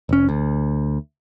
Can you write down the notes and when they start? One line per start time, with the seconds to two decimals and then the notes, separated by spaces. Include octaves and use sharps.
0.09 F1 C#4
0.29 D2